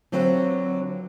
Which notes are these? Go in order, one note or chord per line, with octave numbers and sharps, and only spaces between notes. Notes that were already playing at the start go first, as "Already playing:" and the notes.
D3 F#3 C4 F4 B4